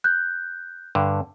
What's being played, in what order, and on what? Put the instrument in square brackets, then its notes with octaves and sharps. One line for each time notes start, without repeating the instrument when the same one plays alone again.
[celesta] F#6 G6
[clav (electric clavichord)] G2 D3